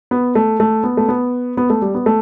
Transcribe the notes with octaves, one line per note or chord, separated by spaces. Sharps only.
B3
A3
A3
B3
A3
B3
B3
A3
G3
B3
A3